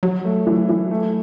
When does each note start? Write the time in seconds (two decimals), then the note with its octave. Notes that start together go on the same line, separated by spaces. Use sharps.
0.03 F#3 F#4
0.24 A3
0.47 E3
0.69 E3
0.91 A3